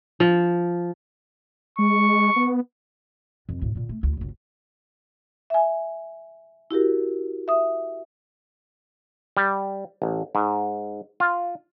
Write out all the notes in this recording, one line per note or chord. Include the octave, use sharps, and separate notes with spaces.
F3
G#3 C#6
B3
F2
D2 A2
A#2 D3
A3
D2 E4
F#1 C#2
E5 G#5
E4 F#4 G4 A#4
E5 D#6
G3
A1
G#2
F4